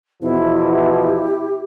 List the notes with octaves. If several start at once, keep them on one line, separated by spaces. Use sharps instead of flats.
E2 B2 F3 E4
G4